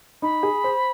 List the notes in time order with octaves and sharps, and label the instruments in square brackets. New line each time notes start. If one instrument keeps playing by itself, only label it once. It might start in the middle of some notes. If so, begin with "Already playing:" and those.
[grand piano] D#4 [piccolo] B5
[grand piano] G#4
C5